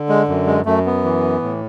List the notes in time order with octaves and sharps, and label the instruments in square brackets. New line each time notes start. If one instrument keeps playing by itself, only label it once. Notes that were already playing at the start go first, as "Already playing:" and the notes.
Already playing: [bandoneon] D3
G#3
F#2
G#3
F#2 A3
B3
E3
A2